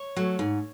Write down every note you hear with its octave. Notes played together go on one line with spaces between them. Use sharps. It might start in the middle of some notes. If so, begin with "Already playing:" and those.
Already playing: C#5
F#3 A3
G#2